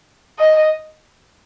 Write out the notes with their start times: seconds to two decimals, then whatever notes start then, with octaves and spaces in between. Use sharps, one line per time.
0.39 D#5